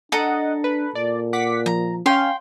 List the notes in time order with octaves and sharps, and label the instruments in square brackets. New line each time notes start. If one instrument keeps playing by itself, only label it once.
[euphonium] D4 [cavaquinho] A4 A#5 [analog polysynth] D#5 F#5
[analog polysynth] B4
[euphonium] A#2 [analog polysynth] D5
[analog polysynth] F#5 D6 B6
[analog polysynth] F3 [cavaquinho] A#5
[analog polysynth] C#4 F5 [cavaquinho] G5 C6